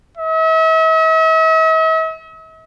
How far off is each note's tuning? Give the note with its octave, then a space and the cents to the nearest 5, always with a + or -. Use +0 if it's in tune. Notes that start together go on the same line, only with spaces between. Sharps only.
E5 -45